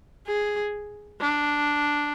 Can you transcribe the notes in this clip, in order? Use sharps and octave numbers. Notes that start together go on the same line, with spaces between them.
G#4
D4